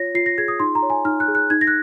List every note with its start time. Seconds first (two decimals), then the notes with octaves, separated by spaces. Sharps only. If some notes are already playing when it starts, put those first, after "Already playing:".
Already playing: F4 C#5 A#6
0.15 F4 C7
0.26 A#6
0.38 G#4 G#6
0.48 D#6
0.60 D#4 C6
0.75 A#5
0.82 C#5
0.90 G#5
1.05 D#4 F6
1.20 F#6
1.28 G#4
1.35 F#6
1.50 D#4 G#6
1.61 A#6
1.67 F#6